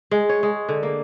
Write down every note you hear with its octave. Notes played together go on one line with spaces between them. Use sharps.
G#3
C#5
G#3
D3
A#3